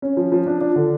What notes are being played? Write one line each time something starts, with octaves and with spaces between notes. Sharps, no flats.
C#4
F3
F3
D4
D4
D3